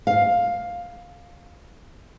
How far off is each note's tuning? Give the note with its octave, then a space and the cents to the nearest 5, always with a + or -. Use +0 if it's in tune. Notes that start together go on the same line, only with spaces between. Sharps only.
F5 +10